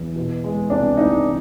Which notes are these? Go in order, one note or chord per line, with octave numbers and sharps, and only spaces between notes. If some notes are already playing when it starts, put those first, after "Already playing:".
Already playing: E2
B2
G#3
C2 D4
C2 D#4
E3